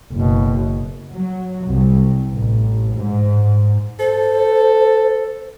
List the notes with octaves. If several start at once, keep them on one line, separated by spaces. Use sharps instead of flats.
F#1 B2
F#3
C2
A1
G#2
A4 C5